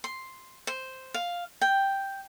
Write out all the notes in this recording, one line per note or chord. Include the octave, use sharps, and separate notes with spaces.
C6
C5
F5
G5